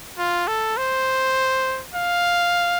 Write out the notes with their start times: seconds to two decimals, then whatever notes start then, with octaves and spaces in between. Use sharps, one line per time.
0.19 F4
0.48 A4
0.77 C5
1.95 F5